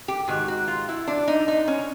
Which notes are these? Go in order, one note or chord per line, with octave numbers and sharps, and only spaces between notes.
G4
G#2 D#3 F#4
F#4
F4
E4
D4
D#4
D#4
C#4